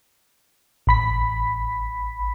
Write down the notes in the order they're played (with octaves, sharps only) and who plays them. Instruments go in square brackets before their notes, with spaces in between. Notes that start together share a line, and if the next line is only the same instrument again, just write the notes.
[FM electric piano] A1 B5 B6